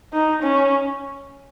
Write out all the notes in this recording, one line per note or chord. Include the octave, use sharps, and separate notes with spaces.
D#4
C#4